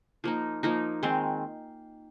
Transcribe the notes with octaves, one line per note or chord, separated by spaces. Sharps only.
F3 A#3 D#4
F3 A#3 D#4
D#3 G#3 C4